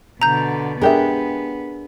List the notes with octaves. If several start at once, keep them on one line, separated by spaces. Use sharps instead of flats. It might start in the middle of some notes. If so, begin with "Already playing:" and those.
B2 D3 A#5 G6
G#3 B3 D4 G4 G#4 A#4 E5